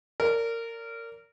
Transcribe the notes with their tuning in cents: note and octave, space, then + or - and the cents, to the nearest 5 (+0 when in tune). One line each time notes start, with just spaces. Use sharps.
A#4 -20 D5 -35